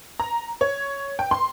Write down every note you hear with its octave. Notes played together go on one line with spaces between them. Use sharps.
A#5
C#5
G5
C6